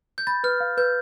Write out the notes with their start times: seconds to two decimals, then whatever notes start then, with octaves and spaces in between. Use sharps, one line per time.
0.18 G6
0.27 B5 A6
0.44 B4 F6
0.60 F5
0.77 B4 G6